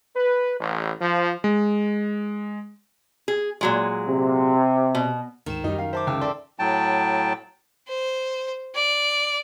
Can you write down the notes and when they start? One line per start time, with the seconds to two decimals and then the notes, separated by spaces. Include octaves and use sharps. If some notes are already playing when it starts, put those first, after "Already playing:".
0.15 B4
0.59 A1
0.99 F3
1.44 G#3
3.28 G#4
3.61 A#2 F#3 G#3
4.08 C3
4.95 B2
5.46 D2 G#2 D#3 E7
5.64 F#2 G3 D#4
5.79 F5
5.93 C5 E5 A5 D6
6.07 C#2 G5 E6
6.22 A4 D5 A5 C6
6.59 A2 F#3 G5 A5
7.88 C5
8.75 D5